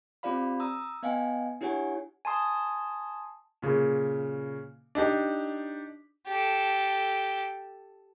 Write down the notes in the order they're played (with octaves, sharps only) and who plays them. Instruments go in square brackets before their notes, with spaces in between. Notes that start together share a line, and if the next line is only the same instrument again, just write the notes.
[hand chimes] C4 F4 G4 D5 F5 B5
A#5 D#6 E6
B3 D#5 F5 G5 G#5
D4 E4 G4 C#5 F#5 G#5
[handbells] G#5 A5 C6 D#6
[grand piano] A#2 C#3
D4 D#4 G4
[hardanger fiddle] G4 A4